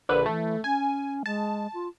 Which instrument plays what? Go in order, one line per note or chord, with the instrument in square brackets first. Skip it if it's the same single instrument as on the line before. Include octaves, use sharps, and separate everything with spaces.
[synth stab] A#1 D3 B4
[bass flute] E3 [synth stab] A3
[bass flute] C#4 [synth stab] G#5
[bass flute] G#3 [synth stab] A5
[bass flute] F4